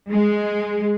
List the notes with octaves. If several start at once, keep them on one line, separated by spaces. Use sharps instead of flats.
G#3